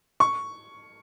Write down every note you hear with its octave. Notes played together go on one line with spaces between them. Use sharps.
C#6